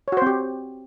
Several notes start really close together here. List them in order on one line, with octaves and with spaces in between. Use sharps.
C#5 F#4 C5 C4 G4